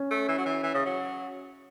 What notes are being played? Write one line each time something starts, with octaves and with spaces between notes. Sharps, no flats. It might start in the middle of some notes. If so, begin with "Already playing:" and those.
Already playing: C#4
A3
E3
F#3
E3
E3
C#3
F#3